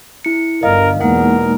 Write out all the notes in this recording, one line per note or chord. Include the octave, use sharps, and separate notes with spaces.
E4 C#7
G1 D2 A#4 D#5 F5
E2 B2 G#3 A#3 D#4 A#4 F#5